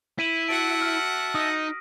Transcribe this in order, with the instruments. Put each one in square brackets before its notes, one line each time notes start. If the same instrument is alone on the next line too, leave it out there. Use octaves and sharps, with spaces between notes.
[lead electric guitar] E4 [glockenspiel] B6 D#7 F#7
[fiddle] F#4 F#5 [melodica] E5 A5 [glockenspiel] D7
[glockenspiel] F6
[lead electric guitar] D#4 [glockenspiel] D#6 A#6